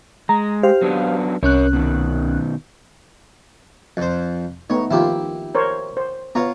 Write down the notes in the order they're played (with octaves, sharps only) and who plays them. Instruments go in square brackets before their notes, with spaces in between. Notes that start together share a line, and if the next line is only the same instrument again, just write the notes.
[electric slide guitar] G#3 [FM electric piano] A#5
[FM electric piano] G4 C5 F5
[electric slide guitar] F#3 B3 D4
[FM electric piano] C2 C#4 F#6 [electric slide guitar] A#4 C#5
[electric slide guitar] B2 D#3
[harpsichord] F2 C5
[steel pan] A3 B3 D#4 [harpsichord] C#5
[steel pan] D#3 F3 F4 [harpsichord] E4 G4
[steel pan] A#4 C5 C#5
C5
[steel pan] B3 [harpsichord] F4 C#5 A#5